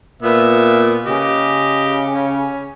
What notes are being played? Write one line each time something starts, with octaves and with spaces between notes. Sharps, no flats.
A#2 B3 B4 E5
C#3 G4 D#5
C#4